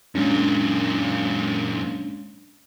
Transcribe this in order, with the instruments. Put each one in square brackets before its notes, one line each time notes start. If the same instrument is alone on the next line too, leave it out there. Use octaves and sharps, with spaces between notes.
[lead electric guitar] F#2 A#2 [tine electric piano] G#3 C#4 D4